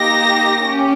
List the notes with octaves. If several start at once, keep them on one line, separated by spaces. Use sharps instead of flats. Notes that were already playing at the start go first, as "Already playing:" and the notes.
Already playing: A#3 D#4 G4 A#6
C#4 G4